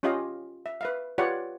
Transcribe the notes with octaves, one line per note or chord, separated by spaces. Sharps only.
C#4 F4 G4 D#5 F5
E5
B4 E5 F5
F4 G4 B4 C#5 D5 F#5